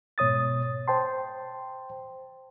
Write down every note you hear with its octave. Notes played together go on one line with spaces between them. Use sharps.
G#2 B2 C#5 D#6 A6
C5 G5 A5 C6